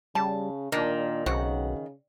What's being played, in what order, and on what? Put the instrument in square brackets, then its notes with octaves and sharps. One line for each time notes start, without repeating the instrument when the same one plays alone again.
[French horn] C#3 [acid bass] G3 [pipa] A5
[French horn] A#2 [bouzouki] D#3 [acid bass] D4
[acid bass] B1 [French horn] C#3 [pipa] C4 F#4 F#5